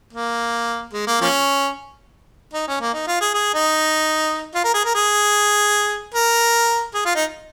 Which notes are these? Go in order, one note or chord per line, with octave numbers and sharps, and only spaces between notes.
A#3
G#3
A#3
F3 A#3 C#4
D#4
C#4
A#3
D#4
F4
G#4
G#4
D#4
F4
A#4
G#4
A#4
G#4
A#4
G#4
F4
D#4